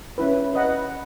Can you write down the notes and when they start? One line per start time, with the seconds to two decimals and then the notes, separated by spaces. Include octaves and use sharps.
0.18 C#4 E4 B4
0.54 B4 D#5 F#5